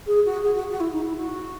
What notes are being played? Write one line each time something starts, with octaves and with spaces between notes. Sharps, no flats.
G#4
F#4
G#4
F#4
F#4
E4
D#4
E4
F#4